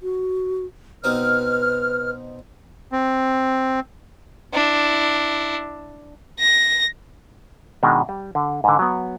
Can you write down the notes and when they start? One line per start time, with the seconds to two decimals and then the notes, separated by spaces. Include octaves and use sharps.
0.02 F#4
1.04 B2 C4 D#4 B4 F6
2.92 C4
4.53 D4 E4
6.40 A#6
7.83 B2 D#3 G#3 D4
8.09 G3
8.35 D3
8.64 G#2 D3
8.79 F#3 B3